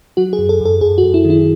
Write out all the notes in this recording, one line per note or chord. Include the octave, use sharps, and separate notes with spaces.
F#3 F#4
G#4
F#2
A4
F#2 A4
F#2 G#4
F#4
F#2
E4
D#3
E4